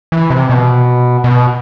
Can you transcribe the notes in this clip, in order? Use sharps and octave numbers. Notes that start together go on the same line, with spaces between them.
E3
C3
B2
B2